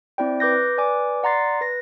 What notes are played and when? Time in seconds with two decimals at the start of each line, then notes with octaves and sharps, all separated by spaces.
0.18 C4 E4 D5 G5
0.40 B4 D6 G6 A#6
0.77 B4 D5 G#5 D6
1.23 D5 F#5 A#5 C6 A6 C7
1.61 B4 A#6